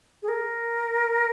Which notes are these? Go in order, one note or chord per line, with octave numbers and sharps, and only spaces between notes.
G#4
A#4